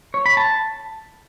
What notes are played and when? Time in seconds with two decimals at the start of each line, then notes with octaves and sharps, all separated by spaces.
0.14 C#5
0.26 B5
0.37 A5